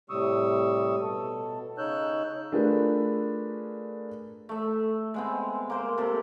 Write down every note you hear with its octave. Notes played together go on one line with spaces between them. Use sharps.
A2 C3 G3 C#6 D#6 E6
B2 A4
C#3 D#4 C#5 E6 F#6 G6
A3 D4 F4 G#4 A#4 B4
A3 E5
G#3 B3 C4
A#3 C5
C3 A4